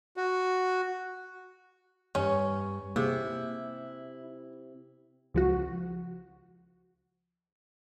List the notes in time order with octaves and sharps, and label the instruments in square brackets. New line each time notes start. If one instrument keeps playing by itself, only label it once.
[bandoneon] F#4
[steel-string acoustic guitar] G2 [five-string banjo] C#4 C#5
[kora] C3 [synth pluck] A#3 G#4 [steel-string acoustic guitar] E4
[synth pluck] C#2 F3 F#4